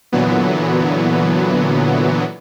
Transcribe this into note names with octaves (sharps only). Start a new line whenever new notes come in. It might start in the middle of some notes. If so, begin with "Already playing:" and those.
A#2 D3 E3 F#3 B3